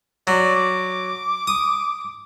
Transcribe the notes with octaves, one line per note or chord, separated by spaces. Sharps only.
F#3 D5
D6
D#6